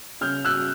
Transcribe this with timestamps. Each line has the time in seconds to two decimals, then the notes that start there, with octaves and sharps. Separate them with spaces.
0.21 C#3 F6 G6
0.45 E6 F#6